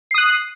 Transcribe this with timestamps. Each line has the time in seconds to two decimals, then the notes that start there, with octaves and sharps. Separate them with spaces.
0.11 C7
0.14 D#6
0.18 F#6